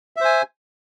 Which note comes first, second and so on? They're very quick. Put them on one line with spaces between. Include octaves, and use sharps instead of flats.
E5 C5 G#5